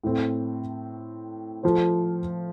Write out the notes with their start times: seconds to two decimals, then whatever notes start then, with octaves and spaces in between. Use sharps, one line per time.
0.03 A2 A3 C4
1.63 F3 A3 F4 C5